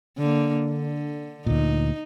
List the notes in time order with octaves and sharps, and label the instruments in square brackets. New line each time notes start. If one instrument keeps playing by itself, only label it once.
[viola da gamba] D3 A#3
D3
[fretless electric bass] D2 A#2 [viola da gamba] D#4